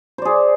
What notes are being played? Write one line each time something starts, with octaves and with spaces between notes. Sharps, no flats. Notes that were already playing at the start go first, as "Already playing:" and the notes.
G#4 C5 D5